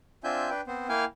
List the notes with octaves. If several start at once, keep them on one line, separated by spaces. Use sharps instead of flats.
C4 D4 F4 E5 G#5 G6
D4 B4 G5
B3 C4 C5
A#3 E4 F5 G5 G#5 F6